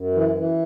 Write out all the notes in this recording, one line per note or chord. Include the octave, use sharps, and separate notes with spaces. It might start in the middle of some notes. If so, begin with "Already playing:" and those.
Already playing: F#2
E3
E3